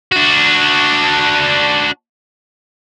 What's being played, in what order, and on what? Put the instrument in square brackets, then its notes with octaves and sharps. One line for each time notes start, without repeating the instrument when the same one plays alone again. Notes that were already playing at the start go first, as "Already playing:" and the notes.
[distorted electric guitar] D4 F#4